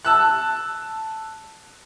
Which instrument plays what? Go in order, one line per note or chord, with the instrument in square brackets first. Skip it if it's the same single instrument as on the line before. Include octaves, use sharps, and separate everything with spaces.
[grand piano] A5 E6 F#6